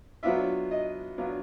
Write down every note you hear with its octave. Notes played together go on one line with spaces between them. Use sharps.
F#3 B3 D4 F4 E5
D#5
F#3 B3 D4 F4